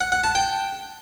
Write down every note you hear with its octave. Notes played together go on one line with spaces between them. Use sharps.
F#5
F#5
A5
G5